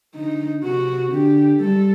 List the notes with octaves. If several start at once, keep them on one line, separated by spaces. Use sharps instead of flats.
D3 D#4
C3 F#4
D3 G4
G3 A4